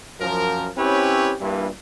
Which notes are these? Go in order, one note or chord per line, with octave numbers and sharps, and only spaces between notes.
F#2 F3 A#4
C4 C#4 E4 G4 B4 C#5
G2 A#2 E3